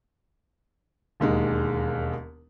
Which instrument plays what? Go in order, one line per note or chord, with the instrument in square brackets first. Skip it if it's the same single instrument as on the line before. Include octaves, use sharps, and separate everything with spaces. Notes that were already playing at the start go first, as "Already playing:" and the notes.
[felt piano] E1 D#2 G#3 D#4